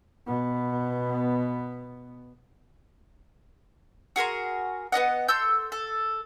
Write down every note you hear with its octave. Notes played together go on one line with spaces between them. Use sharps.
B2 B3
F#4 G#4 A#4 C6
B3 C#4 D#5 F#5
A4 C6 E6 G6
A4